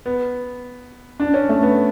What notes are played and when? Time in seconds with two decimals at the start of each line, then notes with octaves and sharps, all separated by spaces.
0.06 B3
1.20 D4
1.34 C#4
1.49 A3
1.63 B3